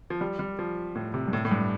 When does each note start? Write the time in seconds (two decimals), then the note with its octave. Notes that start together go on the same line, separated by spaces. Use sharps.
0.10 F3
0.21 G3
0.39 G3
0.59 F3
0.95 A2
1.14 C3
1.28 G2
1.33 A2
1.45 A2
1.51 G2